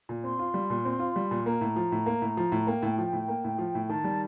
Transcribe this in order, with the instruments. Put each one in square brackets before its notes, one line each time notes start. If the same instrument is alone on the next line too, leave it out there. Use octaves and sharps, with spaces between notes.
[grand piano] A#2
[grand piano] C4 [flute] C6
[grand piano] F4
G3
A#2
C4
F4
G3
A#2
[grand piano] A#3 [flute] A#5
[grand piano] A2
F3
A2
A#3
A2
F3
A2
[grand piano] A#3 [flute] G5
[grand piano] A2
F3
A2
A#3
A2
F3
A2
[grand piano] D#3 [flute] A5
[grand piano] G3